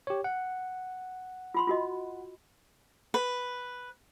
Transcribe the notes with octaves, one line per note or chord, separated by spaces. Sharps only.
G4 C#5
F#5
F4 B5 C6
F4 F#4 D#5
B4